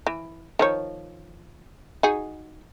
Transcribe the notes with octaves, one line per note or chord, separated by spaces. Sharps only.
E3
D#3 F3 C#5
D#4 F#4 G#4